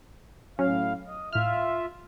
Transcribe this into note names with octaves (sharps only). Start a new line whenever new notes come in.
A2 F#3 C#4 F5
D#5
A2 F4 E5 F6